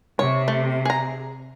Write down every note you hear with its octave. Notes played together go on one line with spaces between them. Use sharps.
C3 C#5
A3
G#4 A#5